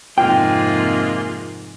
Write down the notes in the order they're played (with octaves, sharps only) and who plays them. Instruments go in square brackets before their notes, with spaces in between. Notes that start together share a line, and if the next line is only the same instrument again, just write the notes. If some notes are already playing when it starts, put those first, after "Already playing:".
[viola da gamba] F2 G#2 C3 [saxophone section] G#3 A#3 F4 [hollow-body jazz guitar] G5